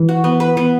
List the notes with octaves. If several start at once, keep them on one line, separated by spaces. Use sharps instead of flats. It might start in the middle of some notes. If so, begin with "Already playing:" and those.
Already playing: E3
F#4
B3
B4
B3